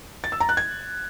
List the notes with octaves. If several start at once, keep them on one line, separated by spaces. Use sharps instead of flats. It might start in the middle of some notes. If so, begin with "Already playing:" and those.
A6
E6
A#5
F#6
G#6